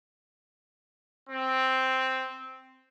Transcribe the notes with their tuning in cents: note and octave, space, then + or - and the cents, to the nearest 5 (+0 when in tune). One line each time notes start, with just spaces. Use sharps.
C4 +0